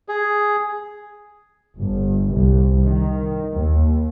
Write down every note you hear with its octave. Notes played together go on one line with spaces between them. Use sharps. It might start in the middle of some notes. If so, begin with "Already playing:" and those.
G#4
G1
C2
D#3
D#2